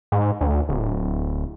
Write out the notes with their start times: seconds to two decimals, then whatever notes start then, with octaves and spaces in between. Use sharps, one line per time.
0.12 G#2
0.41 D2
0.69 D1